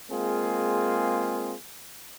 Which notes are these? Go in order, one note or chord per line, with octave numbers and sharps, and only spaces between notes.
G#3 A#3 C4 F4 G#4